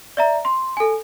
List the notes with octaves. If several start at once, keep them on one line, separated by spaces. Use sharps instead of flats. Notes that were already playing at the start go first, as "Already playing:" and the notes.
D5 E5 A#5
C6
A4 G#5